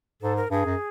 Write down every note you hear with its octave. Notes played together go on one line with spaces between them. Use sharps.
G#2 A4
A#4
G2 G#4
F#2